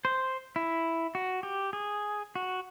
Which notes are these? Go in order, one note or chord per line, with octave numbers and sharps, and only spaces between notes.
C5
E4
F#4
G4
G#4
F#4